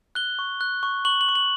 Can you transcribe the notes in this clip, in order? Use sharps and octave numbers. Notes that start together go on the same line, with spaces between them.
F#6 G7
C#6
F#6
C#6
C#6 F#7
F#7
C#6
F#7